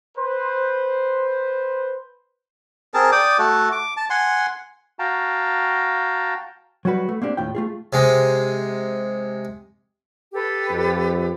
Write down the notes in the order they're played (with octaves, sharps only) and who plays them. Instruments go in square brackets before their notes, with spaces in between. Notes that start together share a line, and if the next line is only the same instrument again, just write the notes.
[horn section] B4 C5
[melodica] C4 G#4 A#4 A5
D5 G5 D6 D#6
A3 F#4 A4
D6
A5
F#5 G#5 C6
[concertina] F#4 F5 G5 A5 A#5
[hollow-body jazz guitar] F#3 G3 F#4 B4
A3
A#3 C4 D4 G4
D#2 A2 F4 G5
A3 F4 G#4
[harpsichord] C3 G#3
[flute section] G4 A4 B4
[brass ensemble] F2